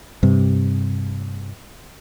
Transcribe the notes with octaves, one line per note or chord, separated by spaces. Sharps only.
G2 C3